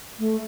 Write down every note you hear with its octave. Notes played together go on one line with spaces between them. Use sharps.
A3